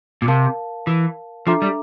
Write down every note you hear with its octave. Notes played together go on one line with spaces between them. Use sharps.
A#2
C3 A#4 F5 A5
E3
F3 D4 A4 E5 A#5 D6
G3